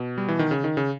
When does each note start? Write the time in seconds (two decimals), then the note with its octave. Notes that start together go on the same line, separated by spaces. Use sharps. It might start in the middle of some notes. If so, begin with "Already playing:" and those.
Already playing: B2
0.18 G3
0.28 E3
0.39 D#3
0.51 C#3
0.64 D#3
0.77 C#3